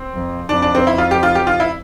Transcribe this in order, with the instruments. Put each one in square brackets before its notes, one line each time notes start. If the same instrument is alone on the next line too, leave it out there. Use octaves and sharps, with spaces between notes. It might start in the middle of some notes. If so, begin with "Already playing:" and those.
Already playing: [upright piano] C4
[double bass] F2
[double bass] F2 [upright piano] D4
[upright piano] D4
C4
E4
F4
G4
F4
G4
F4
E4